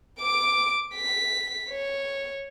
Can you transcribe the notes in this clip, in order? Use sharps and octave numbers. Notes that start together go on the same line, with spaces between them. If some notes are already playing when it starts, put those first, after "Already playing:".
D6 D7
B6
C#5